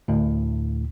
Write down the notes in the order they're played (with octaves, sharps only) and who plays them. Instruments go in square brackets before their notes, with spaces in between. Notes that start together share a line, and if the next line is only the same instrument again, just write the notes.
[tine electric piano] D2 A2